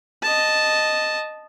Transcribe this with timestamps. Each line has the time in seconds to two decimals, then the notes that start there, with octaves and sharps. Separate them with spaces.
0.23 D#5 A5